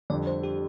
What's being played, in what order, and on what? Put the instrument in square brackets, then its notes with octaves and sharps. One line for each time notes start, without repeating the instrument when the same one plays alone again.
[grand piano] F2 D3 G3 [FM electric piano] D5
[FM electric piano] C5
G4